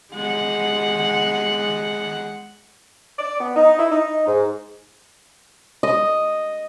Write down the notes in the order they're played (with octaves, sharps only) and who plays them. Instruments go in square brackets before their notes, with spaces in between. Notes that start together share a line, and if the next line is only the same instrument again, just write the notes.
[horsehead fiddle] G#3 F#5
[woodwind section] D5
B3
D#4
E4
D#4
G#2
[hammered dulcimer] D#5